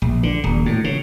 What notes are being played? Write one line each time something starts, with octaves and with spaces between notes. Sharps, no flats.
A#1
D3
D#1
A2
C#3